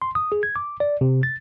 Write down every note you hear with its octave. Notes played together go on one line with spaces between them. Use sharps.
C6
D#6
G#4
G#6
D6
D5
C3
A6